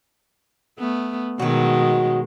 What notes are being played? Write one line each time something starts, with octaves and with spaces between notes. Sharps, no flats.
A3 B3
B2 D#3 F#3 G#3 F#4